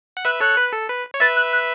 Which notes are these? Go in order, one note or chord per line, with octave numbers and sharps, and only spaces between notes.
F#5
B4 E5 F#6
A4 C#5 F#6
B4
A4
B4
C#5
B4 E5 A6
F#6
F#6